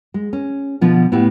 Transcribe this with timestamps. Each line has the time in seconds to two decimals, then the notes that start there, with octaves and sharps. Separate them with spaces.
0.14 G#3
0.33 C#4
0.81 B2 D3 F3 B3
1.12 A2 B3 E4 G4